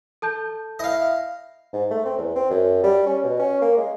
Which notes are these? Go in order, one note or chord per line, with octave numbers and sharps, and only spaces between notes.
A4 A5 G6
E4 D#5 F5
G#2
A3
C4
E2
C4
F#2
G3
C#4
B2
C#4
A#3
G#3